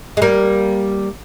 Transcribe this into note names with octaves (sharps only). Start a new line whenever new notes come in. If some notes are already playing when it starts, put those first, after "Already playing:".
G#3
G3 A#3